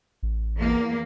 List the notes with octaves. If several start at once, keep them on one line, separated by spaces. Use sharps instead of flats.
A1
E2 A#3